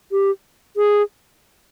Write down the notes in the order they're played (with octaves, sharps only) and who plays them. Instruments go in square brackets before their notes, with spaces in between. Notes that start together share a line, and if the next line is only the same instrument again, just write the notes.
[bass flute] G4
G#4